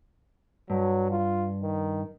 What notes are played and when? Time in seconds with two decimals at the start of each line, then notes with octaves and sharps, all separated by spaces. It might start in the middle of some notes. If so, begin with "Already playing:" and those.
0.70 G2 F#3
1.11 F4
1.63 D#3